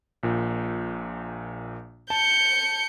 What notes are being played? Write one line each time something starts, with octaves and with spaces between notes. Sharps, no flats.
A#1 A#2
A5 G6 C#7